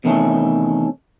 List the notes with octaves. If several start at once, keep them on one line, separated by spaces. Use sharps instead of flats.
E2 C3 D#3 A3 C#4